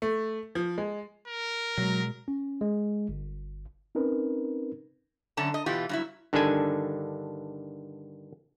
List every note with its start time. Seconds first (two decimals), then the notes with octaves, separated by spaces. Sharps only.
0.02 A3
0.55 F3
0.78 G#3
1.28 A#4
1.78 B2 F#3 G#3
2.28 C#4
2.61 G#3
3.09 G1
3.95 C4 C#4 D#4 A#4 B4
5.37 F#2 D3 C#4 A5
5.54 D#5
5.66 B2 E3 F4 G4
5.89 G2 F#3 E4
6.33 G2 D3 D#3 D4 A4 G#5